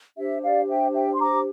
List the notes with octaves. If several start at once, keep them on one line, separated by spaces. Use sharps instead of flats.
D4 G4 C5 E5
D5 F5
E5 G5
E5 G5
C6
A#5 D6